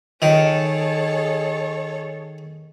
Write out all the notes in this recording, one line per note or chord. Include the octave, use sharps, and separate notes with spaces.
D#3 G#4 A4 C#5